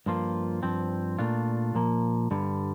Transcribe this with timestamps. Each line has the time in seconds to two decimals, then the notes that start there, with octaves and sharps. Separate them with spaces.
0.06 G2 F3 A#3 F4
0.63 G2 F3 C4
1.19 A#2 A3 D4 F4
1.75 A#2 F3 A#3
2.31 G2 D3 G3